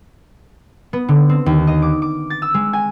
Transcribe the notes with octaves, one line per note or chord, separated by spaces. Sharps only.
B3
D3
C4
D#2
D#5
D6
D6
A6
E6
G#3
G#5